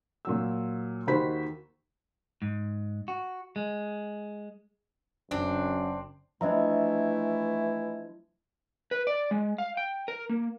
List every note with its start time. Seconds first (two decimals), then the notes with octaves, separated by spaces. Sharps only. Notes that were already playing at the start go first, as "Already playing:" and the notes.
0.25 A#2 F#3 E6
1.07 D#2 D#3 F#4 C5 B5 B6
2.42 G#2
3.08 F#4
3.56 G#3
5.31 F#1 F#2 C#3 C4 D4
6.41 E3 F3 A3 D4 E4 D#5 E5 A#5
8.91 B4
9.07 D5
9.31 G#3
9.58 F5
9.77 G5
10.08 A#4
10.29 A#3